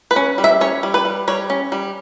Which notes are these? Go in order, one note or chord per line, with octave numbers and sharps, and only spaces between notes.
B4
C#4
G3
E5
C#4 C#5
G3
B4
G3
G3 C#5
C#4
G3